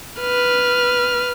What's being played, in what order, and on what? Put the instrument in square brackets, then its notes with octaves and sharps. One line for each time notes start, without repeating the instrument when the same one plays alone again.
[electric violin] B4 F6